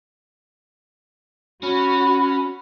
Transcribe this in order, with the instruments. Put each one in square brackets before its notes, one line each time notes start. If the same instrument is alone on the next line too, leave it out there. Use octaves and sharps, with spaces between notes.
[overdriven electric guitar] C#4 [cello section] F#4 [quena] B5